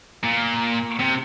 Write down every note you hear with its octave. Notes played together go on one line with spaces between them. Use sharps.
A#2
C3